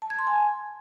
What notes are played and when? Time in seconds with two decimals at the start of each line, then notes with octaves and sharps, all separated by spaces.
0.02 A5
0.10 G#6
0.19 C6
0.27 G#5